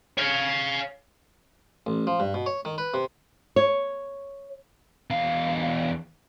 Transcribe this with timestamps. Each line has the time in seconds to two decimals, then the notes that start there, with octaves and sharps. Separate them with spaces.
0.18 C#5 F5
1.86 A1
2.07 F3
2.20 G2
2.34 B2
2.46 C#5
2.65 D#3
2.78 B4
2.94 C3
3.56 C#5
5.10 E2 F5